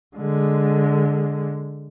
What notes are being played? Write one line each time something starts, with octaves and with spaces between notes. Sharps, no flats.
D3 G#3